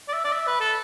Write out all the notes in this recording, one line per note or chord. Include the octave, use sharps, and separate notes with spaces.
D5
E5
D5
E5
B4
A4